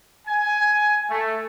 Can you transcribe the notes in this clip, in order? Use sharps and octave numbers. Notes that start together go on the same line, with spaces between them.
G#5
A3